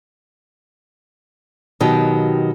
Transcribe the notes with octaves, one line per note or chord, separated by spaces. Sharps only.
B2 D#3 F#3 G4